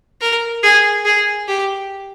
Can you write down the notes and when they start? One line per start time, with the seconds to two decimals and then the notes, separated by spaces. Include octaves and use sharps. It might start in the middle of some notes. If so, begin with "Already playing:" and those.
0.21 A#4
0.63 G#4
1.05 G#4
1.48 G4